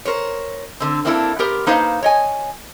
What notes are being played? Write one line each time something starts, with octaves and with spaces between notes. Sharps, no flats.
A#4 C5 C#5
D3 C4
A#3 C4 D4 E4 F4 A4
B3 G4 A#4 C5
A#3 D#4 B4 C5 F5
C#5 D#5 G#5